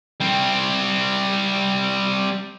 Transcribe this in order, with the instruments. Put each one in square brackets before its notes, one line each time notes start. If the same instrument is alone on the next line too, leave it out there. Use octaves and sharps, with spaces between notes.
[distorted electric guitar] G3 C4